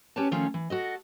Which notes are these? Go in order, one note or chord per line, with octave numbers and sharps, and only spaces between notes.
C#4 G4 B4 C#5 A5
D#3 F3 A3 C#4 F4
E3
F#4 A4 D#5